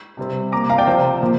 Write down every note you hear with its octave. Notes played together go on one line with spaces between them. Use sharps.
C3 G3 C4
C3 A#3 A#5 D6
F5 A#5
D5 G5
C3 F3 C4 C5 F5
A#2 F3 A#3